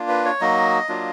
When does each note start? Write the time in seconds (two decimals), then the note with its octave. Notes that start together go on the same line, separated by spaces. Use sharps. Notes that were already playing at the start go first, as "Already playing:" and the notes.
Already playing: A#3 D4 F4
0.09 B4
0.25 C#5
0.41 F#3 A#3 D#4 F#4 D#5
0.89 F#3 A#3 D4 F4